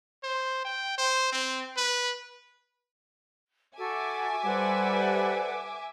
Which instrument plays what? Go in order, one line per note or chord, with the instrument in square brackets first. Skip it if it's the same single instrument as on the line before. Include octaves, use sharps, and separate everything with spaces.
[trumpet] C5
G5
C5
C4
B4
[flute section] F#4 A4 [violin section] E5 G#5 D6
[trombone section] G3 C5 [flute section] A4 B4 F#5